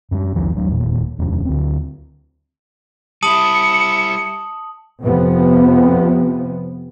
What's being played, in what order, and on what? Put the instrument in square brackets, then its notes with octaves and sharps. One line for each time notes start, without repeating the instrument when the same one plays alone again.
[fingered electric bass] F#2 G3
B1 E2 F3
D1 F#3 D4
E1 A#2
D#1 F2 C#4 D4
D2 C4
[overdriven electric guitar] G3 E4 [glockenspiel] A5 D#6 F#7 [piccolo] C#7
[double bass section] F2 C3 F3 B3